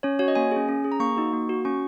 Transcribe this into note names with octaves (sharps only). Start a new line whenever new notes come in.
C#4 C#5
F#4 C#5
D#5
A#3 G#5
C#4 G#4
C#4
G#4
A#5
A#3 C#6
D#4 F#4
A#3
F#4
C#4 C#6